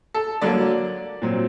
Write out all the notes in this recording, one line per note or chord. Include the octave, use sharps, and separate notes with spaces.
A4
D3 F#3 A#3 D5
A#2 F#3 C4